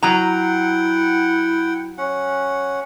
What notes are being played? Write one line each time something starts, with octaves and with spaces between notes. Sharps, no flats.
F#3 E4 F#5 G5 A#5
C#4 F#5